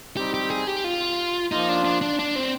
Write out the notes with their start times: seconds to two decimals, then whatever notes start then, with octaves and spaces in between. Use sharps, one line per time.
0.17 G3 C4 D#4 G4
0.34 G4
0.51 G#4
0.67 G4
0.84 F4
1.52 F3 A#3 D#4 F4
1.69 D4
1.85 D4
2.01 D4
2.19 D4
2.36 C4